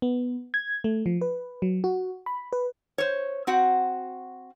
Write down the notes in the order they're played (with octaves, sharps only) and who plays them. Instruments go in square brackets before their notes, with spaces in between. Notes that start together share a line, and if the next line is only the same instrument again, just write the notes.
[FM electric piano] B3
G#6
A3
F3
B4
F#3
F#4
B5
B4
[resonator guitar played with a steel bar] C5 C#5
C4 F#4 F#5